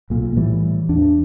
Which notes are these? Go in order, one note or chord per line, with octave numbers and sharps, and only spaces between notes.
B1 A#2
A2 E3 G3
E2 D4